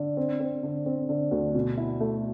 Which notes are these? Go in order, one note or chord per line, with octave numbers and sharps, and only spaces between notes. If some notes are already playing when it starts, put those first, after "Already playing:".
Already playing: D3
C4
C4
D3
C4
D3
D2
B2
E4
A3